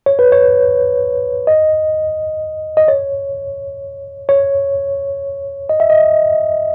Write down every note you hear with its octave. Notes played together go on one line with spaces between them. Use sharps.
C#5
B4
C#5
D#5
D#5
C#5
C#5
D#5
E5
D#5